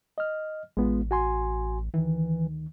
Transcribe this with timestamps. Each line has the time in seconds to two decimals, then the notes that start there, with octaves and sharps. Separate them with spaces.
0.18 D#5 F6
0.77 A1 G#3 B3 F4
1.11 F#4 G#5 C6
1.94 D2 D#3 E3